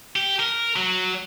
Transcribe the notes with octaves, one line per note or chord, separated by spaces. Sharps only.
G4
A#4
F#3